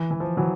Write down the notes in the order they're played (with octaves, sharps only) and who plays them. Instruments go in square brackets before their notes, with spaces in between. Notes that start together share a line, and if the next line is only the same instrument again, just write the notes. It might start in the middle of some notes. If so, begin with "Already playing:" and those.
Already playing: [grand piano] E3
E3
F3
E3 F#3